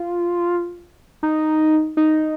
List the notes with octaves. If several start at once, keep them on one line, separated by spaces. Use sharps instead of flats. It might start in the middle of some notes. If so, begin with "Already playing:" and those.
Already playing: F4
D#4
D#4